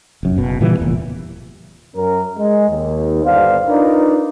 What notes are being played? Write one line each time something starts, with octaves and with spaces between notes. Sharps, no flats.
F1 F#2
F#1 B2
A#2 C#3 E3 G3
F1 E2 A#2
F#2 C#4 A#4
G#3
D#2
G1 B3 D4 C5 F5
D4 D#4 F4 A#4 B4 D5